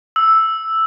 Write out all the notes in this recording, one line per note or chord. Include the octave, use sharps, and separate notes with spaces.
E6